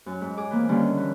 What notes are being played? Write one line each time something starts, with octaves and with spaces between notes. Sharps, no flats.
F#2
G#2
G#4 D6
E3 A#3 C4
D3 D#3 G3 A#3 C#4
E3